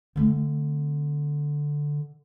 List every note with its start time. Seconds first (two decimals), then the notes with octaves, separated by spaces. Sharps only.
0.16 D3 A3 C4